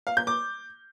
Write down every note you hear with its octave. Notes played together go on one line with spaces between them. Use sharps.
F5
G6
D6